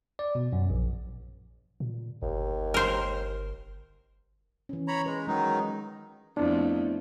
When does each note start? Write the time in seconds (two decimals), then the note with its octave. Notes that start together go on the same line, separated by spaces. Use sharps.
0.19 D5
0.35 B2
0.53 F#2
0.70 A#1
1.80 A#2
2.22 G1 D#2
2.74 A#4 C5
4.69 E3 C#4
4.88 C#5 A#5 B5
5.06 G#3 B4
5.27 D#3 F#3 G#3 D#4
6.37 F2 A3 B3 D4 E4